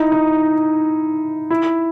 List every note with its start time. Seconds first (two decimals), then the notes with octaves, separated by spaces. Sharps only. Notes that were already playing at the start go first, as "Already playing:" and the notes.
Already playing: D#4 E4
0.12 D#4
1.50 E4